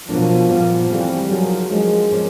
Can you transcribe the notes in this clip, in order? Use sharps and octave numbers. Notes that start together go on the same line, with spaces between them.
B2 F3 F#3 A#3 D4
A#2 F3 G3 B3
C#3 E3 G3 A3 C4
F3 F#3 A#3 D#4 G#4
F3 G#3 A#3 D4
F3 A#3 C#4